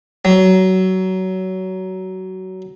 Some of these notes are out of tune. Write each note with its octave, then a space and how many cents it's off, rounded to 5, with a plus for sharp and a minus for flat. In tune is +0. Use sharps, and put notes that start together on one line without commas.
F#3 +20